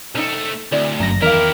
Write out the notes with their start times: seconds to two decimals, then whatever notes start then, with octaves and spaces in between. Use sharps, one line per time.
0.15 C2 A3 C#4 D#4 G5
0.72 D2 C4 E4 D5
1.00 G1 F#2 A3 A#5 A#6
1.22 E2 D#3 E4 G4 A#4 D#5 F5